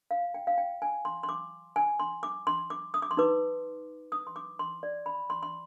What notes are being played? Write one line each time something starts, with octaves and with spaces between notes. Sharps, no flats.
F5
G5
F5
G5
G#5
C6
C6
D6
G#5
C6
D6
C6
D6
D#6
D6
C6
D#4 B4 D6
D#6
C6
D6
C6
D5
B5
C6
C6